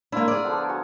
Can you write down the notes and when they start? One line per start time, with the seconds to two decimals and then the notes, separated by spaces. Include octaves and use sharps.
0.12 A#3 D4 E4 F4 A#4
0.28 G#4 D5
0.44 D3 F3 B3
0.69 F#4 F#5 G#5